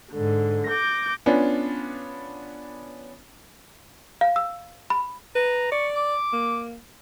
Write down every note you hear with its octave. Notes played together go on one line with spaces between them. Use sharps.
G#2 D3
D6 G6 A#6
B3 C#4 D4 F4
F5
E6
B5
B4 A#5
D5 C#6
D6
A#3